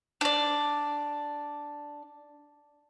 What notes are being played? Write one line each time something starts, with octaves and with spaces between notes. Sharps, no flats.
D4 D5